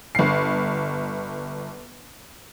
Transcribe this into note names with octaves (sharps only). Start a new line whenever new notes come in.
G1 C7